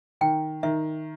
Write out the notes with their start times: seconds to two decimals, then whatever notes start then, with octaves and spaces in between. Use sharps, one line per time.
0.21 D#3 G5
0.63 D#3 E5